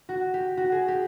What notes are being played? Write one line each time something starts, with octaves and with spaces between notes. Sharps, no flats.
F#4
G4
F#4
G#4
G4